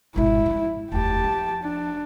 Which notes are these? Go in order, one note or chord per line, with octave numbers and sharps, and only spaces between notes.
G#1 B2 E4
D#3 F3
F1 D#2 G4 A5
F3
D4